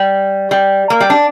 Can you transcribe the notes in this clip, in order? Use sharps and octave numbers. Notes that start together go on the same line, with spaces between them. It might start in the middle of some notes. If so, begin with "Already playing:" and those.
Already playing: G3
G3
A#3
G3
D4